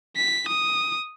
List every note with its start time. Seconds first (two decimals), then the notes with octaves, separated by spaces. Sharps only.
0.16 B6
0.48 D#6